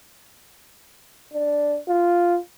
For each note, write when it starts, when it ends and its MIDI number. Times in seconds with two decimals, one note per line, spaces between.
1.34 1.78 62
1.89 2.37 65